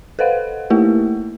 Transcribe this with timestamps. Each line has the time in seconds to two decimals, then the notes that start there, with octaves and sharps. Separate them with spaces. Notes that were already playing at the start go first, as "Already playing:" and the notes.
0.19 A4 B4 C5 F5 F#5
0.70 A3 A#3 E4 G4 A#4